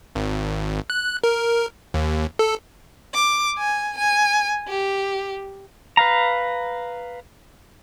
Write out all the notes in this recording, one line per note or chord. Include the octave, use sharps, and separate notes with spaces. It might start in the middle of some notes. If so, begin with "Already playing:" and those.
G#1
F#6
A#4
D#2
A4
D6
G#5
G#5
G4
B4 F5 A#5